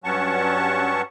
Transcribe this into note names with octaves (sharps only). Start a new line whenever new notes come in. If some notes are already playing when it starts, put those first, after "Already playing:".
G2 F#3 C#4 F#5 A5 C#6